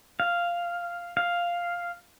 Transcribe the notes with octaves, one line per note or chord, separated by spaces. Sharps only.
F5
F5